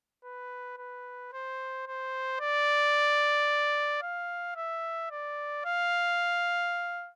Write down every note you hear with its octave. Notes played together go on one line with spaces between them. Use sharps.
B4
B4
C5
C5
D5
F5
E5
D5
F5